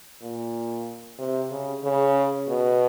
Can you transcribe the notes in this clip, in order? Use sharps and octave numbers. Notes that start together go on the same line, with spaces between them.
A#2
C3
C#3
C#3
B2